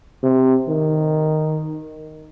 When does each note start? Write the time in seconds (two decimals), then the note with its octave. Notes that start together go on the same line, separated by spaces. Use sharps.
0.23 C3
0.69 D#3